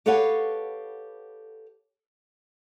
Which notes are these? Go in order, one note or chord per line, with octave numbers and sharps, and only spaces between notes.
G4 A4 B4 C#5 F5 F#5